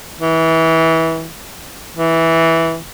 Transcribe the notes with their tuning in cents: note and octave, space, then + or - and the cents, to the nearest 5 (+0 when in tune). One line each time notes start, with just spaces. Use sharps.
E3 -20
E3 -5